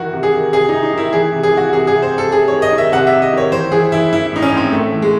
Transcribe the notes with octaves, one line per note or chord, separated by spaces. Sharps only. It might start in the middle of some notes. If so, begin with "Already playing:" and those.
Already playing: D#3 E3 F#4
C3
G#4
D#3
C3 G#4
C3 D#4
D#4
D#3 E4
E3 G#4
C3
G#4
E3 F#4
C3 G#4
G#4
C3
C5
C3
A4
C3 G#4
D#3 C#5
D#5
D#3
E5
C3 F#5
E5
C3
D#5
D#3 C#5
E3 C5
E3 G#4
E3 E4
E3 E4
E4
A2 D#4
C#4
A2
C4
A2 A3
E3
G#3